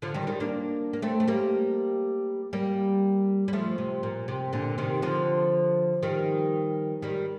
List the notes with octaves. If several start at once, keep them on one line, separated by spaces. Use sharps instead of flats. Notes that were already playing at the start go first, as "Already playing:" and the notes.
D3 F3
D#3 G3
D#3 G3
A#3 D4
A#3
A3 C4
A3
G3 A#3
G3 A#3
G3
F3 A3
C3
A#2
C3
A#2 D3
C3 D#3
D3 F3
D#3 G3
D#3 G3